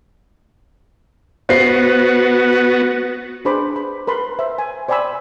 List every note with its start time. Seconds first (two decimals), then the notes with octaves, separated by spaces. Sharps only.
1.49 B3 F#4 C5 C7
3.45 D4 G#4 B4 C5 B5 D6
3.76 B5
4.07 A#4 B4 B5 C6
4.39 C5 E5
4.58 G#5
4.89 C5 D5 G5 G#5 B5 E6